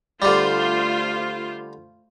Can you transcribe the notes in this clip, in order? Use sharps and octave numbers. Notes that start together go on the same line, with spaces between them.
D3 G3 A3 F4 C5